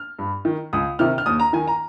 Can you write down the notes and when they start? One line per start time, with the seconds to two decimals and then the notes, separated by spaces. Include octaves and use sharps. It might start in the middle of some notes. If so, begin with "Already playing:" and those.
Already playing: F6
0.19 G2
0.45 D#3
0.73 C#2 D#6
0.99 C3 D#3 F6
1.18 F6
1.26 D#2 D#6
1.40 A#5
1.53 D#3 G#5
1.68 A#5